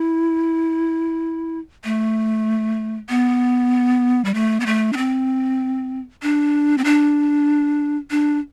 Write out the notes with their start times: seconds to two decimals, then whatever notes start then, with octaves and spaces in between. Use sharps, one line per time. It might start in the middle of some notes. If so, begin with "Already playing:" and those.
Already playing: E4
1.84 A3
3.09 B3
4.25 G3
4.34 A3
4.60 B3
4.66 A3
4.93 D4
4.97 C4
6.22 D4
6.78 C4
6.84 D4
8.11 D4